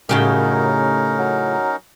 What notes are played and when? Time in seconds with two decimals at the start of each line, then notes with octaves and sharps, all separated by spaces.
0.09 F#2 A2 C#3 C#4 D#4 G4 A#4
1.19 F#3